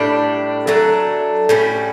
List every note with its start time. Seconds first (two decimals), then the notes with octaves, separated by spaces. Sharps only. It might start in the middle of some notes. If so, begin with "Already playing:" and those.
Already playing: A2 G3 D4
0.67 F#3 A3 D4 A4
1.49 A2 G3 C#4